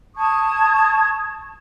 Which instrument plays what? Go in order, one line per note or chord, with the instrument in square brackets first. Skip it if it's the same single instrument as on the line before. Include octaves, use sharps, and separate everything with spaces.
[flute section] A5 C#6 D#6 G#6